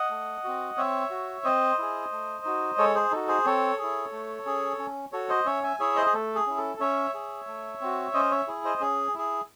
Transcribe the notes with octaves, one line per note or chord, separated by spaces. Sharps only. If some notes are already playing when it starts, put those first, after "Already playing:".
Already playing: D#5 F#5
A3
C4 F#4
C4 C#5 E5
F#4
C4 C5 D#5
E4 G#4
A3
D#4 F#4
G#3 A4 C#5
G#4 C5
D#4 F#4 A4
G#4 C5
C4 A4 C#5
E4 G#4
A3
C#4 G#4
C#4
F#4 A4 C#5
C5 D#5
C#4 C#5 E5
E5 G#5
E4 G#4 C#5 E5
C5 D#5
G#4
A3 A4
G#4
C#4 E4
A4
C#4 C#5 E5
G#4
A3
C4 F#4
C#4 C5 D#5
C#5 E5
E4 G#4
C5 D#5
C#4 G#4
E4 G#4